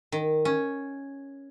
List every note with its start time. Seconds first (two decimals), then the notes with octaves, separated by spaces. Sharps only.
0.12 D#3
0.45 C#4